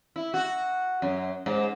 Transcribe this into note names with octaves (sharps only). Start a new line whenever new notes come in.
E4
F#4
F#2
G#2